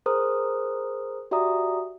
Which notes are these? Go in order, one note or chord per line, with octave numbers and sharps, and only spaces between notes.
G#4 A#4 C5 A#5 D#6 F6
F#4 G4 D5 E5 A#5 D#6